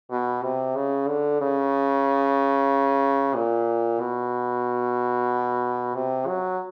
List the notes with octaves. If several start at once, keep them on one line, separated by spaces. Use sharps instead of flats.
B2
C3
C#3
D3
C#3
A#2
B2
C3
F#3